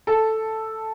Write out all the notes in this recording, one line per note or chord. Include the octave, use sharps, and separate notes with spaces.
A4